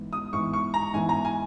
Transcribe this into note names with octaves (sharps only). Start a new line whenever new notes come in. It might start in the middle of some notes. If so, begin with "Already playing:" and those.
Already playing: G#2 E3 B3
D#6
G#2 E3 B3 C#6
C#6
A#5
G#2 E3 B3 G#5
A#5
G#5